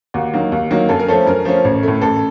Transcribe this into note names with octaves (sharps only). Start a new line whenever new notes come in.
D#2 F#4
D#3 F#3 A#3
D#2
D#3 F#3 A#3
F#2 A4
A#4
F3 A3 C#4 A4
F#2 A#4
F3 A3 C#4
A1
A2 A3
A1 A4